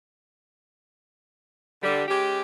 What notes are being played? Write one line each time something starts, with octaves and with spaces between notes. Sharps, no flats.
D3 G3
G#3 C#4 G4